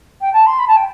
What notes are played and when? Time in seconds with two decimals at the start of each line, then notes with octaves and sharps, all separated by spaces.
0.21 G5
0.34 A5
0.47 C6
0.59 B5
0.68 A5
0.77 G5